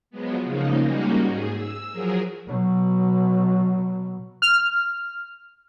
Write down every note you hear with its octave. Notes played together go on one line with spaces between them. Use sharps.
F3 F#3 G#3 B3
C#3 F3 G#3 A#3 D#4
G3 G#3 A#3 C#4 D#4 F#4
G#2 G#4
E6
F3 F#3 G#4 A#4
B2 F#3
F6